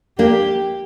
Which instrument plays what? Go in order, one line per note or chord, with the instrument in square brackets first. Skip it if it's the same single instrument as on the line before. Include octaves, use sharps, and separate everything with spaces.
[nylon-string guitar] A#3 D4 [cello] G4